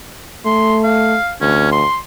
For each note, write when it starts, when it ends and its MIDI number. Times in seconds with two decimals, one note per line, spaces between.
0.46 1.16 57
0.46 0.78 84
0.84 1.33 77
1.41 1.84 38
1.41 1.69 61
1.72 1.97 84